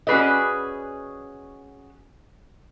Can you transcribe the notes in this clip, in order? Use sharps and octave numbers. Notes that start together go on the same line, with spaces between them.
C#4 F#4 G#4 B4 D5 D#5